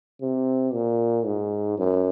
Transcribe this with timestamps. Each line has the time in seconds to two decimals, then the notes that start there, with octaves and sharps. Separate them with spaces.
0.22 C3
0.74 A#2
1.26 G#2
1.78 F#2